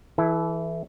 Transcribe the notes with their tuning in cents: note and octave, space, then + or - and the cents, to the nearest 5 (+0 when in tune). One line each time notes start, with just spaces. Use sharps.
E3 -5 E4 +0 A4 -40